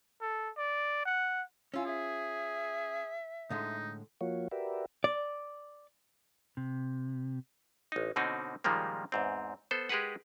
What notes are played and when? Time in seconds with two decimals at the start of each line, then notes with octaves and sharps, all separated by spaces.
0.21 A4
0.57 D5
1.05 F#5
1.74 C#4 E4 F4 G#5 E6
1.86 G#4 E5
3.50 A2 D3 G#3 D#4
4.21 F3 A#3 F4 F#4 C#5
4.51 F#4 G4 A#4 B4 D5 E5
5.04 D5
6.57 C3
7.92 A1 D#4
8.16 B2 D3 C4 C#4 D#4 F#4
8.64 A#2 D#3 F3 G3 G#3 A#3
9.12 E2 G#2 C4
9.71 B3 A4 C5
9.89 G#3 G4 G#4 A#4 B4 F#5